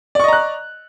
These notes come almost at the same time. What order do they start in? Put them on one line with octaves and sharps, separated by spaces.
D5 C#6 D#5 A#5 F#6